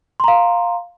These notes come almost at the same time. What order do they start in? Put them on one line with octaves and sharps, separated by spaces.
C6 A#5 F5